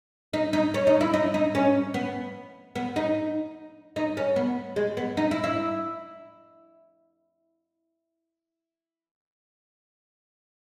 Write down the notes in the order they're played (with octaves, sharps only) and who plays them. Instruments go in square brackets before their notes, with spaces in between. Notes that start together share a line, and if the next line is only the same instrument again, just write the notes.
[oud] D#4
D#4
C#4
D#4
E4
D#4
D#4
C#4
B3
B3
D#4
D#4
C#4
B3
G#3
B3
D#4
E4
E4